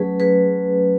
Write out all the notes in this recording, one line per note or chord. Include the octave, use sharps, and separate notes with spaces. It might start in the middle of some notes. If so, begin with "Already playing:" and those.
Already playing: F#3 A3 C#4 G#4 B4
G#4 B4